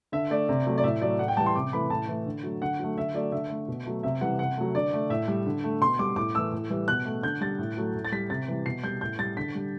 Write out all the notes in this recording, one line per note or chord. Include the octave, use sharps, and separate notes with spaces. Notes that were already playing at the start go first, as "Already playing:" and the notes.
D3 E5
A3 D5
C3
F#3 A3
D5
A2 E5
F#3 A3 D5
A2 F#5
G5
E3 G3 A5
C6
C3 D6
E3 A3 B5
A2 A5
E3 A3
D3
F#3 A3
D3 F#5
F#3 A3
D3 E5
F#3 A3 D5
D3 E5
A3
B2
F#3 A3
C3 E5
E3 G3 F#5
C3 F#5
F#3 A3
D3 D5
A3
A2 E5
G3
D3
A3
B2 C6
G3 D6
A2 D6
E3 A3 E6
A2
E3 G3
B2 F#6
A3
D3 G6
G3 A6
A2
F#3 A3
A2
A6
G3 B6
C3 A6
E3 G3
B2 C7
G3 G6
A2 G6
G3 A6
D3 B6
G3